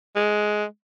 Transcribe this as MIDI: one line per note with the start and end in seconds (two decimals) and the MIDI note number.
0.16 0.64 56